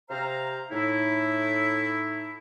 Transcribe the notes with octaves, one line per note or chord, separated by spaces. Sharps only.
C3 C5 F5 A#5
A2 D#4 E4